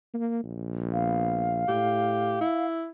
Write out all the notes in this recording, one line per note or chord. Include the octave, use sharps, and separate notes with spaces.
A#3
A#1
B3 F5
A2 G4
E4